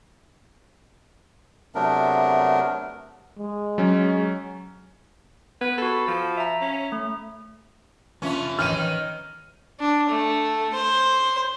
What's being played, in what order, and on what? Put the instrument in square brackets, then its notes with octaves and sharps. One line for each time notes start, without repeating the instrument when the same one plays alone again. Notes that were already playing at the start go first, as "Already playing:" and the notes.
[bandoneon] C3 F#3 A3 B3 D4 A#4
[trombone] G#3
[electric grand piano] F#3 C#4
[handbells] B3 [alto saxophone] B4
[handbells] F#4 B5 [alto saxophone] A4
[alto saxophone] F3
[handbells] E5 A#5
[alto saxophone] C#4
[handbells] A3
[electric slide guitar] F2 F3 E5 [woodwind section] A#3 D4 F4 [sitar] C#4
[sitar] D#3 [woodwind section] E3 C#5 [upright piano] F6 D#7
[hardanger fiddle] D4
A3
C5